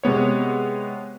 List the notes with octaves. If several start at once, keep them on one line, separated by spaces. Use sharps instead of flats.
C3 G#3 B3 C#5